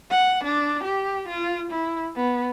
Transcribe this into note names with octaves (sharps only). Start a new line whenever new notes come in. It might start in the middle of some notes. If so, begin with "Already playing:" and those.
F#5
D4
G4
F4
E4
B3